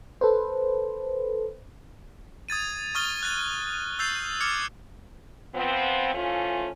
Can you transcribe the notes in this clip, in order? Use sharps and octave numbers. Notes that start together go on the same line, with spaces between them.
A4 B4 C5
D#6 G#6 A6 D#7
C#6 D#6 F6 A6 G7
F#6 A6
E6 G6 A6 C7 F7
D6 F6 G#6 C#7
F3 B3 C4
E3 F3 A3 C#4 F4